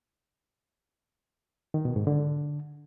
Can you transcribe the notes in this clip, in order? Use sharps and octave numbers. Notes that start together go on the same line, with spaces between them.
D#3
B2
G#2
D3